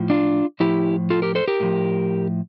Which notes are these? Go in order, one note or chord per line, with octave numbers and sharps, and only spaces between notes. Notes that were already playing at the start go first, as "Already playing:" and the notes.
Already playing: A2 F3
D4 F4
A2 F3 E4 G4
F4 A4
G4 A#4
A4 C5
G4 A#4
A2 F3